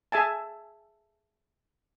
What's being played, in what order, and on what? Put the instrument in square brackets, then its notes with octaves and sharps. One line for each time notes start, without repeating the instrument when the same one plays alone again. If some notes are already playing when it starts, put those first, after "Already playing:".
[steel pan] G#4 E5 G#5 A5